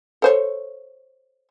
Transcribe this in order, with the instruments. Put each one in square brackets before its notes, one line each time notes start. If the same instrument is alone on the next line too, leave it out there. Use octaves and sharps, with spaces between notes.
[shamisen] A4 C5 C#5